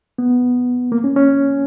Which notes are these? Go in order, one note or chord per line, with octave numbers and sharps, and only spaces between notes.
B3
A#3
C#4
C#4